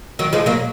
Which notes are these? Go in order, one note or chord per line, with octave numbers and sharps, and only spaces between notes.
D#3 F#3
F3 G#3
F#3 A#3